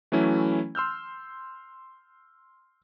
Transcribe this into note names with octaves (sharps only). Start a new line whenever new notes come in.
E3 F#3 A3 C#4 E4
C6 E6 F6 G6